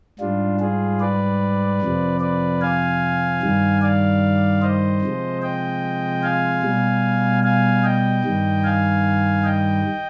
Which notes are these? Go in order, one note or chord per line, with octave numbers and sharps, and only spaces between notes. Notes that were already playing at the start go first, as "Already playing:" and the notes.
G#2 G3 D4 F4
F4 G#4
B4 D5
F2 C3 F3
B4 D5
F5 G#5
G2 D#3 G3
D5 F5
C5 D#5
C3 F3 G#3
D#5 G5
F5 G#5
B2 G3
F5 G#5
D#5 G5
G2 D#3 G3
F5 G#5
D#5 G5